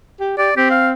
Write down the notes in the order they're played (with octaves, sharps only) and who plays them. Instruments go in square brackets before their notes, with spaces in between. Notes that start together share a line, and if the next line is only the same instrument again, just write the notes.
[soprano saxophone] G4
[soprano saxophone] G4 [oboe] D5
[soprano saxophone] C4 [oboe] G4
[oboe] F5